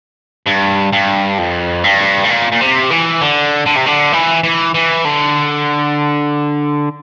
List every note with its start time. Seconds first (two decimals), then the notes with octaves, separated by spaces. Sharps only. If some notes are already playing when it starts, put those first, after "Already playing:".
0.46 G2
0.93 G2
1.38 F2
1.84 G2
2.25 A2
2.30 A#2
2.52 A#2
2.61 C3
2.91 E3
3.21 D3
3.67 D3
3.77 C3
3.87 D3
4.13 E3
4.44 E3
4.75 E3
5.05 D3